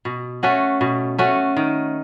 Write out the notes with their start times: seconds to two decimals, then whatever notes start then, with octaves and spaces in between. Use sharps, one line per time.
0.05 B2
0.43 A3 C#4 F#4
0.81 B2
1.18 A3 C#4 F#4
1.57 D#3